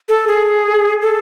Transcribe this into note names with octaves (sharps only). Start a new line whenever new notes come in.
A4
G#4
A4